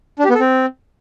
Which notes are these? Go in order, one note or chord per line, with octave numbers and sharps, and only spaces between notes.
D4
G4
B3
A4
C4